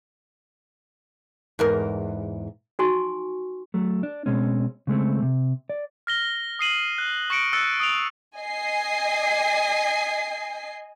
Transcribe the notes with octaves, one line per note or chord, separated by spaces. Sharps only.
E2 G#2 A#4
D#4 F#4 G#5 C6 C#6
F#3 A3
D4
B2 G#3 C4 C#4
C#3 G#3 A3 C4
C3
D5
F6 A#6 G7
D#6 C7 D#7 F#7
F#6
C#6 A#6 C#7 D7
E6 F#6 A6 C#7
D#6 D7 F7
D#5 G#5 C7